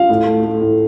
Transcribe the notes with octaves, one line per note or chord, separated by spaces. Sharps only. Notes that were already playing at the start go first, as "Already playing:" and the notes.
Already playing: F4 F5
A2
A3
A3
A2